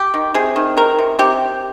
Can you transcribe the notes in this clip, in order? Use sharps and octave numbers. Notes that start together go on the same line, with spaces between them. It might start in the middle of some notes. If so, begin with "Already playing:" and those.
Already playing: G4
D#3
C3 G#4
D#3
D#3 A#4
C3
C3 G4